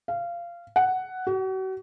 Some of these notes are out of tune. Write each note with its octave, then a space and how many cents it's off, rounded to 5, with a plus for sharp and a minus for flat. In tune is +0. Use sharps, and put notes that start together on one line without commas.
F5 -20
F#5 +5
F#4 +40